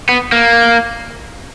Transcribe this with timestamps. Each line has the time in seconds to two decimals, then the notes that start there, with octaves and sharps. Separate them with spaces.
0.09 B3
0.32 A#3